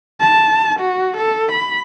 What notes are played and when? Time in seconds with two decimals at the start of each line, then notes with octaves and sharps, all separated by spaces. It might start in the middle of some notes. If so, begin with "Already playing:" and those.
0.20 A5
0.80 F#4
1.17 A4
1.52 B5